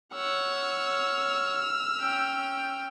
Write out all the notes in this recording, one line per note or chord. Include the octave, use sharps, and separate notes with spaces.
C#5 F#5 E6 F6
C#4 G5